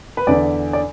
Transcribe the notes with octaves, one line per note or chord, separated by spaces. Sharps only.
B4
E2 D3 D5
D5